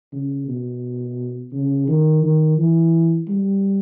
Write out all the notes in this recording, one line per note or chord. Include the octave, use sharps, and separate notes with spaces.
C#3
B2
C#3
D#3
D#3
E3
G3